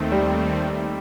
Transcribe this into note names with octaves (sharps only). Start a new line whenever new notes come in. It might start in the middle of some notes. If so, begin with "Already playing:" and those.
Already playing: D#2 D#3 A3 C4
G3